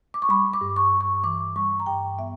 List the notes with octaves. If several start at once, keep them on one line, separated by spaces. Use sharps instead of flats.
D6
C#6
G3 B5
D6
G2
C#6
G2
C#6
E3 D6
G3 C#6
A#5
G2 G5
B3 E5